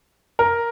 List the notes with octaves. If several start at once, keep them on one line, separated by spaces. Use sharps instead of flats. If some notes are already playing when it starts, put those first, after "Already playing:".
A#4